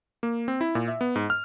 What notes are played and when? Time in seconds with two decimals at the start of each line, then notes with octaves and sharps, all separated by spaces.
0.23 A#3
0.48 C4
0.61 E4
0.75 A#2
0.88 E5
1.01 B3
1.16 G#2
1.30 F6